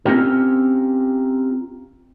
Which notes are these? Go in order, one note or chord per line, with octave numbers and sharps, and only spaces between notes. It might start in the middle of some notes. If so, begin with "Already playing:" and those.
C4 C#4 F4 G4 A#4